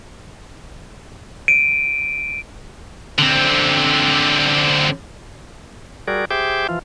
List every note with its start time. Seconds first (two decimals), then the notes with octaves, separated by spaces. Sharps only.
1.48 D7 D#7
3.19 D3 C4
6.07 G3 F#4 G#4 A#4 D5
6.31 G4 G#4 C5 E5 G5 D6
6.69 E3 F3 F4